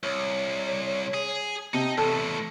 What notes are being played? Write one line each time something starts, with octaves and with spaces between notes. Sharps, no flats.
C2 C#5
G#4
C3 D#4 D#5 A5
E2 A2 A4 A5